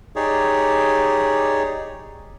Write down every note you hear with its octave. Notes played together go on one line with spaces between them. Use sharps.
D#4 G4 G#4 C#5 D5